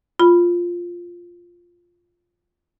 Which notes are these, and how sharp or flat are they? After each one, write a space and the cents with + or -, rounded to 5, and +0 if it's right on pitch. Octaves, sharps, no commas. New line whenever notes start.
F4 +0 B5 +0